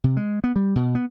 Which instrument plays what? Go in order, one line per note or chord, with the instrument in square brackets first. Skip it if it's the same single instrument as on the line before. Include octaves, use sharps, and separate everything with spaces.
[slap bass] C3
G#3
B3
G3
B2
B3